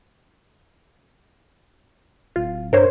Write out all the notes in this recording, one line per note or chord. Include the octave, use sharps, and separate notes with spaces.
D1 F4
G2 A#4 C5 C#5